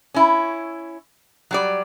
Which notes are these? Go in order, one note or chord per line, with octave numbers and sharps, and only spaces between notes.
C#4 E4
F#3 G3 D5